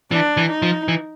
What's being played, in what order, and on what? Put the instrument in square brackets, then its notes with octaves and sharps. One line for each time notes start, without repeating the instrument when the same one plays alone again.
[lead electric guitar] E3 [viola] D4
[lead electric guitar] E3
[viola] D#4
[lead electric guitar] F3
E3